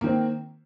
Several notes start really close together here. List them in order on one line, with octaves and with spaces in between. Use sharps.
A#3 D#3 C4